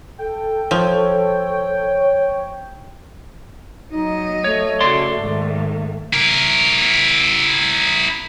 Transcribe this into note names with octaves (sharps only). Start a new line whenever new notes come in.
A4 G5
F3 C#5
F#3 D#4 D#5
A3 C#5
C#3 F#4 D5 C6
G#2 D#3
E4 A#4